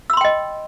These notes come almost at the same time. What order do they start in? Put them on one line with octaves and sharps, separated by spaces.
E6 B5 C6 G5 D#5